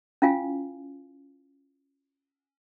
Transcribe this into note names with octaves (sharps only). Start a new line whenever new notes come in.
C#4 E4 F4 F5 G#5